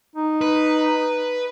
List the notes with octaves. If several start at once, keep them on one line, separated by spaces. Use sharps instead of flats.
D#4
B4